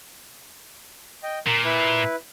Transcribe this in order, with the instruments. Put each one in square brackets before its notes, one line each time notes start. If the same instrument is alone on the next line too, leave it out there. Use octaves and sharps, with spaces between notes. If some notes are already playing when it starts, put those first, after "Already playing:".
[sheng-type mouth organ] D#5 G5
[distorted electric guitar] A#2 [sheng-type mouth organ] A#4
[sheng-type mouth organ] E4 B4